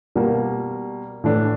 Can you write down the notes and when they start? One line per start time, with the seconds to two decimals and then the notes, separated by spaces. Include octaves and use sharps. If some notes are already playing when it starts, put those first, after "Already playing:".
0.15 B2 G3 A#3
1.24 A2 E3 A3 D4